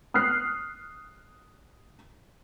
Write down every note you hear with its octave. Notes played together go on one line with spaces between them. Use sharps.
D#6 F6 F#6 C7